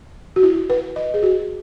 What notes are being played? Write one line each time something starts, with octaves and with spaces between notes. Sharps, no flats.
F#4
E4
B4
D#5
G#4
F#4